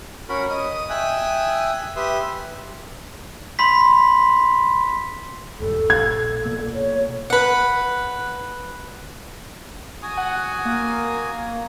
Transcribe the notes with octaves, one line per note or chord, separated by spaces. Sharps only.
C#4 F#4 A#4 B5
D#5 D#6
E5 G5 G#5 D#6 F#6
G4 B4 E5 C6 D#6
B5 C6 B6
D#1 G2 G3 A4
A#1 G#6
B2 A#3
C#5
B4 F#5
F#4 G#5 D#6
F#5
A#3